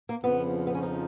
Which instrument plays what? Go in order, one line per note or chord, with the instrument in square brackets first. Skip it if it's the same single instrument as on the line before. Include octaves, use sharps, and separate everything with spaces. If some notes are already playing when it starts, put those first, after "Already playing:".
[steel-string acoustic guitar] A#3
[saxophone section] F2 C#3 F3 [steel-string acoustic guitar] B3
[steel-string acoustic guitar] B3
C#4
D#4